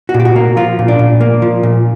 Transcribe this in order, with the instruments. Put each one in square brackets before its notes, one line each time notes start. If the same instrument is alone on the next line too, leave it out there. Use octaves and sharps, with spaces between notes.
[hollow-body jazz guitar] F#4
A#2
G4
F#4
A#3
F3 F4
A#2
D4
A#2
A#3
F3
A#2